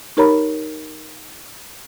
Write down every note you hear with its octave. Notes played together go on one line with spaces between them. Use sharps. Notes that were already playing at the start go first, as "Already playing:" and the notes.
D#4 G4 A#4 C#5 A#5 B5